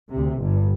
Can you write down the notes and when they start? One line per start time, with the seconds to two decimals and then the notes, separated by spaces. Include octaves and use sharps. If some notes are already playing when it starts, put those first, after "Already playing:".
0.11 D2 C3
0.40 G1 G2